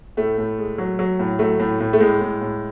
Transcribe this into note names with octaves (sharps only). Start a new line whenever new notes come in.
A2 A3
A2
G#3
F#3
F#3
A2
F#3 A3
A2
A2
A3
A2 G#3
A2
A2